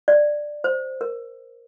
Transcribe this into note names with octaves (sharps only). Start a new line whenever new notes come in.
D5
C5
A#4